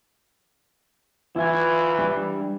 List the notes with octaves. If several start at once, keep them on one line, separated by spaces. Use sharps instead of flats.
E3 E4 F4 G#5
G3 D4